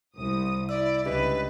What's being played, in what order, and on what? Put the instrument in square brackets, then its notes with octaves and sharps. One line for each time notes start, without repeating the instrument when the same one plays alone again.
[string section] C2 D#6
[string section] E4 [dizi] D5 [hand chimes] E6
[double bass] C#2 [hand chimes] D4 G4 D#5 [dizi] B4